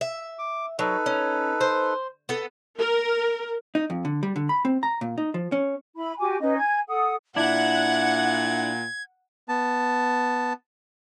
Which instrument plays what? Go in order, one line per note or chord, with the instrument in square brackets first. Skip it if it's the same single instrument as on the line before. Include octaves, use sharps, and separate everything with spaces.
[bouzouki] E5
[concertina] D6
[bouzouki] F#3 [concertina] D#4 A4 B4
[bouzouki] C#4
C5
B3 A4
[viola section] A#4
[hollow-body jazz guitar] D#4
F2
D3
G3
D3
B5
C4
A#5
A#2
D#4
F3
C#4
[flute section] E4 B5
F#4 G4 G#5 D6
C#4 D#4 B4 D#5
G#5 G#6
A4 F#5 D#6
[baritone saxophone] A#2 [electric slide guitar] D4 E4 [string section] F#5 [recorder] G#6
[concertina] B3 A5